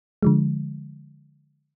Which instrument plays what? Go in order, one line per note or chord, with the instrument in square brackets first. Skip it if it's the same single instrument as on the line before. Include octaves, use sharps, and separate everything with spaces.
[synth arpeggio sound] D3 F3 G#3